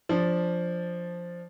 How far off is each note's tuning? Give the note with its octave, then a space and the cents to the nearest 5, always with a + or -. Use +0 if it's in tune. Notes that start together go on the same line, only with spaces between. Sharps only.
F3 +0 D4 -10